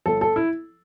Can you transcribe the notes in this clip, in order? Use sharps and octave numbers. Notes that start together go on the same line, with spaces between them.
G1 A4
A4
E4